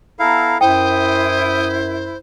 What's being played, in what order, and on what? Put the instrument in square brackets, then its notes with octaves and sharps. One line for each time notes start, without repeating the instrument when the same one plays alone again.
[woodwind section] B3 A4 A#5 [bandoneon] E4 F5
[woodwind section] F#2 E4 [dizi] C5 [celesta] G5 [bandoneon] D#6